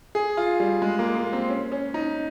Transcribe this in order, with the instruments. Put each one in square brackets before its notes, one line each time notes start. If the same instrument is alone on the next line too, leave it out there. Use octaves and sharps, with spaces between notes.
[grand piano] G#4
F4
G3
G#3
A#3
A#3
C4
C#4
C#4
D#4